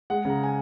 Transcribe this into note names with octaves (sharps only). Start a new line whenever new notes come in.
G#3 F#5
C#3 A#5
G#5